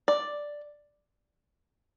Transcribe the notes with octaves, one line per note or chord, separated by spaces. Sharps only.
D5